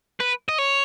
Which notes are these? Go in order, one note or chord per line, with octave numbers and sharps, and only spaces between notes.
B4
D#5
C#5